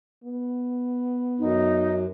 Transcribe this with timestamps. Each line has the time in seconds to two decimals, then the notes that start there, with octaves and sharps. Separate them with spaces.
0.24 B3
1.39 F#2 D#4